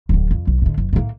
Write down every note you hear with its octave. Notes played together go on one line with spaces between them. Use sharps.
D1 D3
F2
B1
A2 D3
F#1
A2 A#3